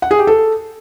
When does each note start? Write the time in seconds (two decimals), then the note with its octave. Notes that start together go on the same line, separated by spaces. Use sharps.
0.02 F#5
0.11 G#4
0.19 G4
0.27 A4